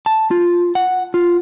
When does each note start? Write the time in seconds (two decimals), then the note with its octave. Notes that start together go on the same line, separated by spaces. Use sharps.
0.06 A5
0.31 F4
0.75 F#5
1.14 F4